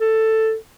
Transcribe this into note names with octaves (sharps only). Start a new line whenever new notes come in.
A4